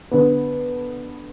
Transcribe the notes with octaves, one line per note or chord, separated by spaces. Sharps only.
D3 B3